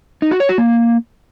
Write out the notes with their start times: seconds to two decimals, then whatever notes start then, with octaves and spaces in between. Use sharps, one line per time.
0.22 D#4
0.31 F#4
0.40 C#5
0.49 F#4
0.58 A#3